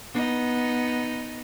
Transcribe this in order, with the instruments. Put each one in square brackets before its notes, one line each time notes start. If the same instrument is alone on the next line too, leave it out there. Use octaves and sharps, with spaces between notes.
[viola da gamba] B3 D#4